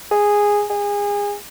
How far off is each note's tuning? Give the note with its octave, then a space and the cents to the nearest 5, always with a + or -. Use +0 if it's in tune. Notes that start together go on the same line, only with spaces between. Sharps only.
G#4 -10
G#4 -30